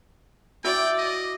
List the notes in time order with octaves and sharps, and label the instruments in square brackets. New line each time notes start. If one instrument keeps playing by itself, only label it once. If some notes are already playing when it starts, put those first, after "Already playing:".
[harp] E4 F#4 E5 [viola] D5 [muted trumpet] G5
[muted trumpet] D#5